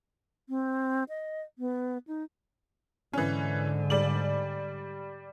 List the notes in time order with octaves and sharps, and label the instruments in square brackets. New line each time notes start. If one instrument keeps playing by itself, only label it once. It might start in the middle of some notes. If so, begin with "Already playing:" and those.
[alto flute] C4
D#5
B3
D#4
[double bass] G#2 D3 [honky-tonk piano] E3 C#4
[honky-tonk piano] G3 D5 F#7